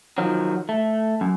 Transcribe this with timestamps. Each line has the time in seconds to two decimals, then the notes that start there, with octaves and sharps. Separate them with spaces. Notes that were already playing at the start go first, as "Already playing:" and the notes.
0.18 D#3 F3 F#3
0.69 A3
1.21 F#2